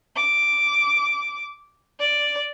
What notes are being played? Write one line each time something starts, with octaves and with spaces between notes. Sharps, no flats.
D6
D5